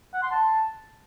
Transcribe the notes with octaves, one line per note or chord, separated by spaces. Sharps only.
F#5
C6
A5